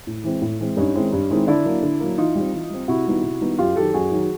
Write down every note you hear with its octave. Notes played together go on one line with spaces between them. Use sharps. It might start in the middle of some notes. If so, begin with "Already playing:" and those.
A2
E3 G#3 C4
A2
E3 G#3 C4
G2 C#4 D#4
D#3 G#3 C4 E4
G2
D#3 G#3 C4 E4
D3 D4 E4
F#3 A#3
D3
F#3 A#3
E3 D#4 F4
G3 C4
E3
G3 C4
C3 E4 F#4
D#3 G3 B3 D#4
C3
D#3 G3 B3 D#4
F#2 F4 G4
D#3 F#3 G4 A4
F#2 F#4 G#4
D#3 F#3